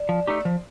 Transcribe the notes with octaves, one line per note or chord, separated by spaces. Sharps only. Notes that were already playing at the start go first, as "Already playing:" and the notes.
Already playing: D4
F3
A3 D#4 G4
D4
F3 C4